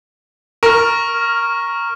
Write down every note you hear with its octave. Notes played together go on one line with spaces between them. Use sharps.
A#4 C#6 F6